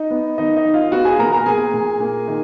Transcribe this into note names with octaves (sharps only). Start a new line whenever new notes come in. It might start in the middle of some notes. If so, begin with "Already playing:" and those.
Already playing: D#4 D#5
B3
D#3 D#4 D#5
D#4 D#5
D#3
F4 F5
B3 F#4 F#5
G#4 G#5
A#2 A#4 A#5
A#4 A#5
A#2 G#4 G#5
A#2
A#3
D#3